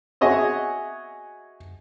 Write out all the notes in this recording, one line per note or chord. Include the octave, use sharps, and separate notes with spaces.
F#4 G#4 C#5 D#5 E5